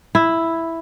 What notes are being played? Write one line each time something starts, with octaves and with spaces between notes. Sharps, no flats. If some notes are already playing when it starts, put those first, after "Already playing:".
E4